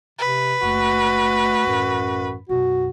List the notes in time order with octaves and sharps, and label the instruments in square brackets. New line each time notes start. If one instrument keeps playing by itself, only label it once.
[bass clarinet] C3 [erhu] B4
[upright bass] F#1 [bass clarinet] A3 [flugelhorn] F#4
[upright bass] A1 [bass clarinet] F#2
[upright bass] B1 F#2 [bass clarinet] F#4